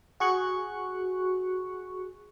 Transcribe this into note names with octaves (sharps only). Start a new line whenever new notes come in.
F#4 G#4 C#6 F#6 C#7